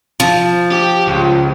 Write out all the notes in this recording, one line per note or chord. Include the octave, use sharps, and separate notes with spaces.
F3
G4
C#2